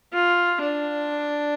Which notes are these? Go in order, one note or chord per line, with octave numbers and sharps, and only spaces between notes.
F4
D4